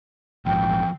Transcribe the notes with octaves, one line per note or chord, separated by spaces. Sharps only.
A#1 E2 G#2 F3 G5